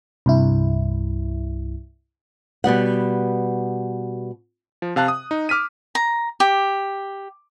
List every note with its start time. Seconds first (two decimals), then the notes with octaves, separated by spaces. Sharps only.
0.26 C2 G2 E4
2.64 B2 G3 B3 F#5
4.82 F3
4.96 C3 F5 A5 F#6
5.08 D#6
5.31 D#4
5.49 D6 F6 B6 D#7
5.95 A#5
6.40 G4